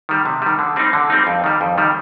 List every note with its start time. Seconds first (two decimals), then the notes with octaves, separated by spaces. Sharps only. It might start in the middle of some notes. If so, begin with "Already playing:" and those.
0.09 D#3 G3
0.26 C3
0.42 D#3 G3
0.59 D3
0.76 G3 C4 D#4
0.93 D3
1.10 G3 C4 D#4
1.27 F2
1.44 D#3 G3
1.61 F2
1.78 D#3 G3